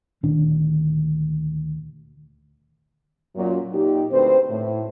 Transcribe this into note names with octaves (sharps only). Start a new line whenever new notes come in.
D2 A#2 D#3 D4
F#2 A#2 F#3
A#2 D#4 G4
D2 C4 B4 C5
A2